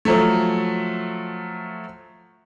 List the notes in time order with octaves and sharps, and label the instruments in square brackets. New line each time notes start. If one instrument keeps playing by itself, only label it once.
[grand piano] F3 F#3 A3